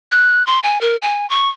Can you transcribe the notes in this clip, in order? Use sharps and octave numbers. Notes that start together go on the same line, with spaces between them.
F#6
C6
G#5
A#4
G#5
C#6